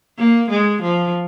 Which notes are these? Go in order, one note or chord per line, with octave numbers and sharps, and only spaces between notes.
A#3
G#3
F3